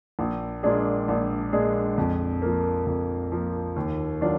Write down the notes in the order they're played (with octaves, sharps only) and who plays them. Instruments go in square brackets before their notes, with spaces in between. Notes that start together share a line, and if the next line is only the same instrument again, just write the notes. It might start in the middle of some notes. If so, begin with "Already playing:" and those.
[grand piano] A#1
A#2 G#3 D4 G#4
A#1
A#2 G#3 D4 G#4
F2
F3 A#3
F2
F3 A#3
D#2
D#3 F#3 D4 F4